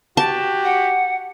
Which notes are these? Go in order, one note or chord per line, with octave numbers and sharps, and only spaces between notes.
F#4 G4 A5
F#5